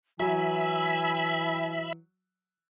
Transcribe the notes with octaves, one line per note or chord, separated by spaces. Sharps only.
E3 F#3 E5 G#5 B5